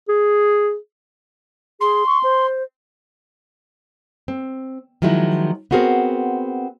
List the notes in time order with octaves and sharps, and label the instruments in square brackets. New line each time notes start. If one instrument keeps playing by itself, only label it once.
[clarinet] G#4
[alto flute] G#4 [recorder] C6
[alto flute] C#6
C5
[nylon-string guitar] C4
D#3 F3 F#3 G#3 E4
B3 C4 F#4 G#4 A#4 C5